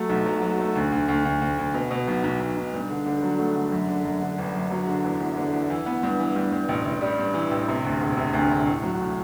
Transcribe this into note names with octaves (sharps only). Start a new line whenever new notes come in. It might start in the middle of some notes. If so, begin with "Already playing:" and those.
Already playing: F#3 A3
B1
F#3
F#3
A3
D2
D2
D2
D2
D2
D2
B2
B2
B1
B1
B1
B1
G2
D3
D3
F#3
A3
D3
F#2
D3
F#2
D3
G1
F#2
F#3
D3
E2
E2
D3
E2
E3
B3
G2
E3
G2
G2
A1
A1
G3
G2
E3
A1
C3
D2
E1
C3
D2
E1
A2
F#3
A2